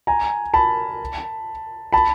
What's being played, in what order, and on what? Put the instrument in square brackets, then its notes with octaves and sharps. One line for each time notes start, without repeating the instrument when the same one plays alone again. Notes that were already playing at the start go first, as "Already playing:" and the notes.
[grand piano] G#5 A#5
A5 B5
A5 B5